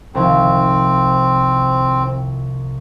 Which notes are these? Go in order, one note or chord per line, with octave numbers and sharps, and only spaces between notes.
C2 D#3 F3 C4